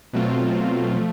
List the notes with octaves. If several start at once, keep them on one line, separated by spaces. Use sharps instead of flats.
B2 F#3 A3 C4 F4
F3 A3